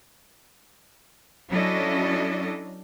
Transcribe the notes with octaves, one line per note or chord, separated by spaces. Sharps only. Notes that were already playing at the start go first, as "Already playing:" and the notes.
F#3 C#4 D4 E4 A4 D#5